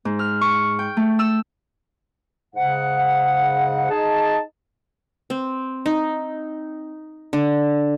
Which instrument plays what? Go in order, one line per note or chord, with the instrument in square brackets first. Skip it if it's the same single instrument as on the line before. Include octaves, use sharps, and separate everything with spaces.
[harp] G#2
F6
C#6
G5
A3
E6
[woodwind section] G#2 C#3 F#5
D#4 G#4 A5
[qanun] C4
D#4
D3